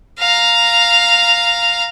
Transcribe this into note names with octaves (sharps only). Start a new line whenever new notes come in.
F5 A#5